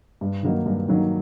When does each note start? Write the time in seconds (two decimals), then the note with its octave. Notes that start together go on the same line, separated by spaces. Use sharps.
0.21 G2
0.43 D#3 F#3 A#3 D#4
0.66 G2
0.88 D#3 F#3 A#3 D#4